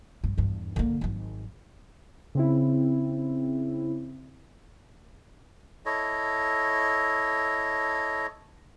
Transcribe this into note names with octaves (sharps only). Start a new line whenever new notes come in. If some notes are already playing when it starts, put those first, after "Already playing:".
G2
E2 G2
D3 A#3
G#1 F#3
C#3 C4 E4
E4 A4 C#5 D#5